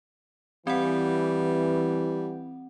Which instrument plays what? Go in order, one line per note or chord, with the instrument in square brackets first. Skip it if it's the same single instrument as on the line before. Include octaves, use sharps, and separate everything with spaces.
[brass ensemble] E3 [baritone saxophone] G3 [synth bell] C4 F#5